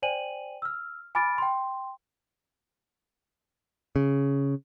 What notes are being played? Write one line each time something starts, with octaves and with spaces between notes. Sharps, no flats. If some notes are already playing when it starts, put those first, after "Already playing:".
C5 D5 G5 G#5 D#7 F#7
E6 F6
G#5 B5 D6 F6 A6 D7
G5 C6
C#3